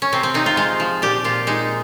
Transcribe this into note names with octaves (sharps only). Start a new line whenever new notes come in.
C#4
C3 C4
C4
C3 D#4
F4
G#3 F4
F3
A#2 G4
A#2 F4
G#3 D#4